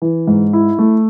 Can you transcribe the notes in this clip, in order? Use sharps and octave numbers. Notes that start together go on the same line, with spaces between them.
E3
G#2
E4
A3